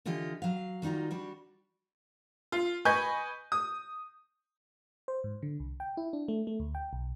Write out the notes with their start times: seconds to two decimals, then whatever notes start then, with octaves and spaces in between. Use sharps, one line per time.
0.05 D3 E3 F4 G4 D#5
0.42 F#3 F5
0.82 D#3 G3 D#4 F4 F#4
1.11 G3 D4 F#4
2.52 F4
2.85 B4 D#5 G#5 B5 C#6 G6
3.52 D#6
5.08 C5
5.24 G#2
5.43 D3
5.60 C2
5.80 G5
5.97 E4
6.13 D4
6.28 A3
6.47 A3
6.60 D2
6.75 G5
6.93 B1